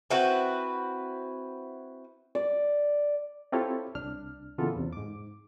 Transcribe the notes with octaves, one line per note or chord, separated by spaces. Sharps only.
C4 E4 F#4 B4
D5
C4 E4 F4 G4 A4 C#5
C2 D4 F6
A#2 C#3 E3 B3 F4 A4
E2 C3
G#2 D6